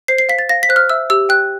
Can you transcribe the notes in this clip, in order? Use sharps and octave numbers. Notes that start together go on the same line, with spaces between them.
C5 C7
C7
F5 B6
A6
F5 A#6
B6
C5 F#6
F6
E5 E6
G4 E6
G5 F#6